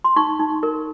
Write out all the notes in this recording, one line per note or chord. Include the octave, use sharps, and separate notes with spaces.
C6
D#4 C#6
D#4
A#4